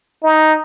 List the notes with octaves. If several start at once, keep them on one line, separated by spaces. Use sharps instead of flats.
D#4